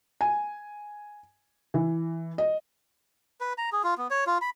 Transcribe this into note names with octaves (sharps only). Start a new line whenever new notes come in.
G#5
E3
D#5
B4
A#5
G#4
F4
B3
C#5
F4
B5